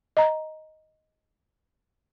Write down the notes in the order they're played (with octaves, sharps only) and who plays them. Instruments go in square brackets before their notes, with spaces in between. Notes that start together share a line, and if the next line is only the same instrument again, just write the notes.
[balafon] D#5 A#5